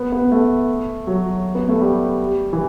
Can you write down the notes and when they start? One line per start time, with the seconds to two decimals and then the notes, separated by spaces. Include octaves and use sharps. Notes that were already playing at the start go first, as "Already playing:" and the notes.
Already playing: B3
0.12 B3
0.32 A3
1.07 F#3
1.55 B3
1.69 A3
1.81 G3
2.53 E3